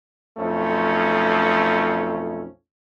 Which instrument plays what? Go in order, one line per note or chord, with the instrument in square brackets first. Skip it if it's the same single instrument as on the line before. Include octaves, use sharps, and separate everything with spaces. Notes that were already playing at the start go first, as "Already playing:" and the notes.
[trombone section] B1 F2 A3 C#4